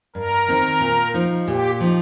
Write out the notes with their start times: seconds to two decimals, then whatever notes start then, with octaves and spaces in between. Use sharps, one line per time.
0.15 G2 A#4
0.48 D#3 C4 D#4
0.81 A#2
1.14 F3 D#4
1.47 A#2 G4
1.80 F3 D#4